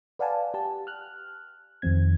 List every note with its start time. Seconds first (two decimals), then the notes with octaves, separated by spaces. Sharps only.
0.19 B4 D5 F5 F#5 G#5 A5
0.54 G4 A5
0.87 F6 F#6
1.82 F2 D#3 F3 C4 G#6